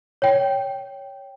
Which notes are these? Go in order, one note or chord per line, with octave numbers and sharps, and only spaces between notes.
C#5 G5